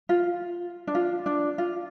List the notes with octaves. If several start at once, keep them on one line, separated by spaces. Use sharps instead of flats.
F4
D4
F4
D4
F4